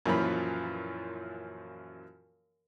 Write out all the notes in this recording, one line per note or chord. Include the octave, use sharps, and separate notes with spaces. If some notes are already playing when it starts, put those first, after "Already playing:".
F#2 A#2 E3 F3 B5